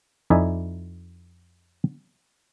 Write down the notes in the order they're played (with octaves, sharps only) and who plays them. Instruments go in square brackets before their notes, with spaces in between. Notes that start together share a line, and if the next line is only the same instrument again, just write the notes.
[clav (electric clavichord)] F2 D#4 E4 D5 E5 G#5